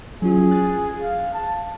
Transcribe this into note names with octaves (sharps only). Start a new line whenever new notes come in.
F#3 C#4 F4 G#4
F#6 A6
F5
A5